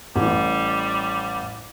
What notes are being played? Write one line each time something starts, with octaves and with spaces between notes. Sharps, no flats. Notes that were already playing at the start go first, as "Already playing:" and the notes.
A1 A2 G3